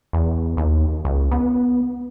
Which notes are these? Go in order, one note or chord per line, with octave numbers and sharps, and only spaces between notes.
E2
D#2
C#2
B3